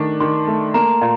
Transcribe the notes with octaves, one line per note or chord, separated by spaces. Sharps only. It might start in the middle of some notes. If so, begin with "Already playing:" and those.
Already playing: D#3 A3 D4
D#3 C6
A3
A#3 A#5
A#2